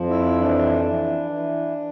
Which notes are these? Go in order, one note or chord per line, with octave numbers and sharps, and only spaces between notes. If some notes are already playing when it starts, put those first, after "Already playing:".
Already playing: F2 F3
E4
E3 D4
E3
E3